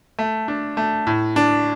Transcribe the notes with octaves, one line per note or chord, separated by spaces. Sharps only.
A3
D4
A3
A2
D4